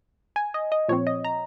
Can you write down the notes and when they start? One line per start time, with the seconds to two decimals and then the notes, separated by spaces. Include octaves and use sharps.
0.36 G#5
0.54 D#5
0.72 D#5
0.88 A#2 F3 C4 C#5
1.07 D#5
1.24 A#5